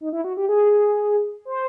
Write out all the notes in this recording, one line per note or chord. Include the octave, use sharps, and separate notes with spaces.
D#4
E4
F#4
G4
G#4
C5